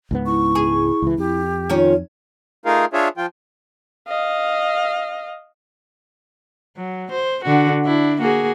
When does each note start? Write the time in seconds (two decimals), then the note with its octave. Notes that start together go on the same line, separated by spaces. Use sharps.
0.11 C#2 G#2 B3
0.26 E4 C#6
0.55 G#4
1.02 C#2 E3
1.18 F2 G4
1.70 D#3 C#4 F4 C#5
2.65 A3 D#4 F4 G#4 A#4 F5
2.93 D4 F4 G#4 C#5 E5
3.17 F3 F4 G5
4.08 D#5 F5
6.77 F#3
7.11 C5
7.45 D3 F#4
7.85 D4 E4
8.21 A#3 F#4 G#4